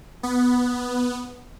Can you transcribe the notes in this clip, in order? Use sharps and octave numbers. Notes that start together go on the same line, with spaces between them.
B3